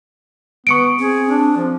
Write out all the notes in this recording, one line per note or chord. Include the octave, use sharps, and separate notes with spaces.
B3 C#6 C#7 D7
C4 G#4
D4
F3